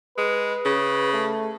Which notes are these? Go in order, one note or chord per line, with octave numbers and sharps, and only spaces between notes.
G#3 B4
C#3
A3